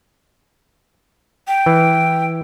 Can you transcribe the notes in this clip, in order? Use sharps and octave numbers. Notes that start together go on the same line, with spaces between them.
G5
E3